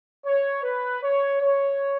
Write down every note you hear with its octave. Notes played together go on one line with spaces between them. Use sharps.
C#5
B4
C#5
C#5